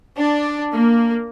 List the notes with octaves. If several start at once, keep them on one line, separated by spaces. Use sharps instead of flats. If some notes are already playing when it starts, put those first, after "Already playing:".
D4
A#3